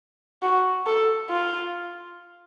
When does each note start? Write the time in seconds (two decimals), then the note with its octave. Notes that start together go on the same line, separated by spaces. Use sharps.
0.43 F#4
0.86 A4
1.30 F4